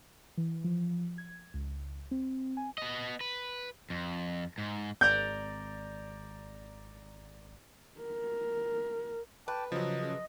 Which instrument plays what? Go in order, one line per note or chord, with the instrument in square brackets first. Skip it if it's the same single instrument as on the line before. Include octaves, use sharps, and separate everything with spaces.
[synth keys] E3
F3
G#6
C#2
C4
G#5
[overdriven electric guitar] B3 D#5
B4
F2
G#2
[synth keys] G#1 D5 A#5 [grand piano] G6
[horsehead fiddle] A#4
[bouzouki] B4 [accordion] G5 A5 D6
[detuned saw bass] C#3 [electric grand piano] F3 F#3 [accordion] D#5